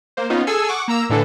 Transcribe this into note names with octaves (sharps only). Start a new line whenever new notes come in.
A#3 C5
B3 C#4 D#4 F4
G#4 A4 G#5 E6
F#5 C#6 D6
A#3 A#5 E6
A2 D3 E3 D4 A4